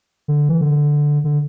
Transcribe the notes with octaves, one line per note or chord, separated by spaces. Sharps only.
D3
E3
D3
D3